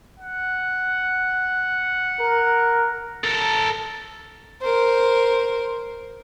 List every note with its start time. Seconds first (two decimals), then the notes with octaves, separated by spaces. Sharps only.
0.19 F#5
2.20 A#4
3.24 A4 A#4
4.62 A#4 C5